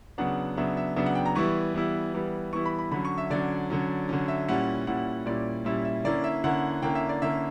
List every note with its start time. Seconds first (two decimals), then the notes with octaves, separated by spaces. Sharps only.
0.18 C#3 F#3 B3 D4 F#5
0.57 C#3 F#3 B3 D4 E5
0.77 E5
0.96 C#3 F#3 B3 D4 E5
1.06 F#5
1.15 G5
1.26 A#5
1.35 E3 G3 B3 E4 C#6
1.74 E3 G3 B3 E4
2.14 E3 G3 B3 E4
2.53 E3 G3 B3 E4 C#6
2.66 B5
2.78 B5
2.91 D3 F#3 C#4 B5
3.05 C#6
3.18 E5
3.30 D3 F#3 C#4 D5
3.70 D3 F#3 C#4
4.09 D3 F#3 C#4
4.28 E5
4.48 A#2 G3 C#4 E4 F#5
4.87 A#2 G3 C#4 E4 F#5
5.26 A#2 G3 C#4 E4 D5
5.65 A#2 G3 C#4 E4 E5
5.85 E5
6.04 D3 A#3 C#4 E4 D5
6.24 E5
6.44 D3 A#3 C#4 E4 F#5
6.82 D3 A#3 C#4 E4 G5
6.95 E5
7.09 D5
7.22 D3 A#3 C#4 E4 E5